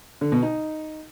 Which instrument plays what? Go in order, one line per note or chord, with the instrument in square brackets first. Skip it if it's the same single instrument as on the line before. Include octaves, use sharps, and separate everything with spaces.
[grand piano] D3
B2
D#4